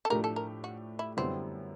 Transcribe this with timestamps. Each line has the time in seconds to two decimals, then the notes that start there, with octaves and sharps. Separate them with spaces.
0.05 A4
0.10 A2 F3 A3 D4 G4 A#4
0.24 A4
0.36 A#4
0.64 F#4
0.99 E4
1.17 F#2 D3 G3 B3 C4 E4